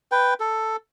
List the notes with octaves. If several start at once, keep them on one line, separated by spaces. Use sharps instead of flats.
B4 G5
A4